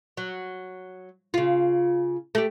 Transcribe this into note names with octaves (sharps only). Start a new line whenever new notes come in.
F#3
C#3 F4
A3 G4